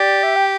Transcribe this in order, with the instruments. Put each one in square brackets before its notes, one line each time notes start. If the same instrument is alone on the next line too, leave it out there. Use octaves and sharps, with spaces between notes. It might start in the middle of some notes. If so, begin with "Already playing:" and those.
Already playing: [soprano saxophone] G4 [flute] D5
[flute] E5
G5